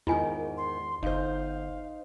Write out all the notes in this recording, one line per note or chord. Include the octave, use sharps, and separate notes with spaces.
E2 G#2 D#3 E4 F4 A#4 G#5
C6
G1 D#4 C5 F5